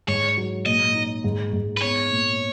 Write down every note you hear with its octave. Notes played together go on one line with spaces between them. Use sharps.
G#2 C#5
F#3
A#2 D#5
D#4
G#2
G#2
B4
B3 C#5
A#2